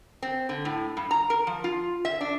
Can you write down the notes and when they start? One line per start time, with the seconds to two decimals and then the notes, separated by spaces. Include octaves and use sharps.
0.22 C4
0.49 D3
0.65 A2
0.97 G2
1.11 A#5
1.30 A#4
1.47 F3
1.64 F4
2.05 E5
2.21 D4